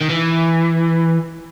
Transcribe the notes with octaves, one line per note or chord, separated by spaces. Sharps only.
D#3
E3